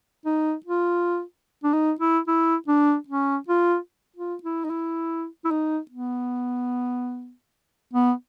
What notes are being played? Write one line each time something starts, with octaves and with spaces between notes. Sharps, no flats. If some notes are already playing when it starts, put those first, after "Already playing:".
D#4
F4
D4
D#4
E4
E4
D4
C#4
F4
F4
E4
D#4
E4
E4
D#4
B3
B3